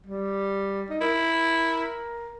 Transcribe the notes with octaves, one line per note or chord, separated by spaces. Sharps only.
G3
D#4
E4 A#4